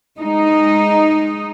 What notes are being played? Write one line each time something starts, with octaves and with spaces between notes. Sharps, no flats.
G#3 D#4